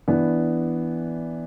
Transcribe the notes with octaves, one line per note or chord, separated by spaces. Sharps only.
E3 B3 D4